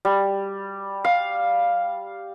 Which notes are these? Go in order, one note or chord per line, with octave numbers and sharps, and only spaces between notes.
G3
F5